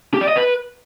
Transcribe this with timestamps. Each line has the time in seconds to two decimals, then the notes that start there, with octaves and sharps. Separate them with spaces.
0.14 G4
0.21 D5
0.29 D#5
0.36 B4